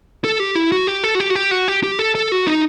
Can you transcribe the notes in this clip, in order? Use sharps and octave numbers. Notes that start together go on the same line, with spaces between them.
A4
G4
E4
F#4
G4
A4
F#4
G4
F#4
G4
F#4
G4
G4
A4
A4
F#4
D#4